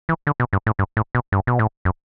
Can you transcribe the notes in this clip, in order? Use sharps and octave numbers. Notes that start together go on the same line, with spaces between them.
E3
D3
B2
G2
A2
G2
A2
B2
G2
B2
A2
F#2